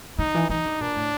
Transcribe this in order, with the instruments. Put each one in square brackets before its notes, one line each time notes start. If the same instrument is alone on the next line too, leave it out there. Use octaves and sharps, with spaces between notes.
[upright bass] D3 [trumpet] D#4
[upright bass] E3
[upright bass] E3 [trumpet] D#4
[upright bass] D3
[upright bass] A#2 [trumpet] D4
[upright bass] A2